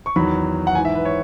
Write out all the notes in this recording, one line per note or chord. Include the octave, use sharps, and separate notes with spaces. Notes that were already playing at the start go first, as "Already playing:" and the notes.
C#6
E2 D#3 F#3 B5
F#5
G#2 E3 G#5
E5
B4
C#5